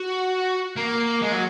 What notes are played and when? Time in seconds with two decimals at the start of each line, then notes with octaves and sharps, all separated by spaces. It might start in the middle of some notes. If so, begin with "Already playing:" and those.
Already playing: F#4
0.77 A#3
1.22 G#3
1.32 F#3